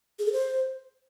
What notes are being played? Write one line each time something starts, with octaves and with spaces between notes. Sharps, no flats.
G#4
A4
C5